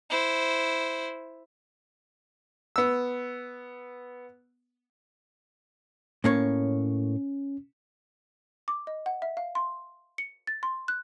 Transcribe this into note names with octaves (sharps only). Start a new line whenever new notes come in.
E4 C5
B3 E6
A2 A#3 C#4 C#5
D6
D#5
F#5
E5
F5
C6
C#7
A6
C6
F#6